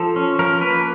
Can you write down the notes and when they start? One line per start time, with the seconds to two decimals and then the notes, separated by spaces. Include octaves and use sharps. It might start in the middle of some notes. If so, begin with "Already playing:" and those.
Already playing: F3 A4
0.16 C#4
0.39 F3 A#4
0.61 A#3 B4